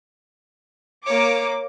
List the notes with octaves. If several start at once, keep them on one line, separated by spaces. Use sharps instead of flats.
A#3 C#5 D6